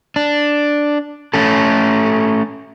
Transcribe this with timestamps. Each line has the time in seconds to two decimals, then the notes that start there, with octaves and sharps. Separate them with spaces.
0.16 D4
1.34 A3 C#4 A4